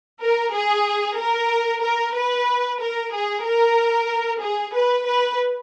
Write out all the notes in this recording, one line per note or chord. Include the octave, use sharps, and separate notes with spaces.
A#4
G#4
A#4
A#4
B4
A#4
G#4
A#4
G#4
B4
B4